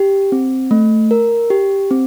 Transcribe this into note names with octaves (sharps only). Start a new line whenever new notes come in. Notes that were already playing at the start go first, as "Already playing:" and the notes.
Already playing: G4
C4
A3
A#4
G4
C4